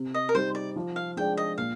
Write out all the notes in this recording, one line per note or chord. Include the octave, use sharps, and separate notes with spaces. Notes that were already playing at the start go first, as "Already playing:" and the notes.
Already playing: C3
D#5
A#4
G3 C4 D#4 C5
D5
F3
F5
G#3 D4 G#4 D5 G5
D#5
A#2 F5